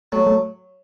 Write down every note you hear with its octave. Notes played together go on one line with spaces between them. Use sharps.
F#3 A3
A3